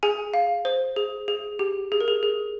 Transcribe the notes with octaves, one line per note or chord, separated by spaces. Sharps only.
G#4 G#5
F5
C5
G#4
G#4
G4
G#4
A#4
G#4
G#4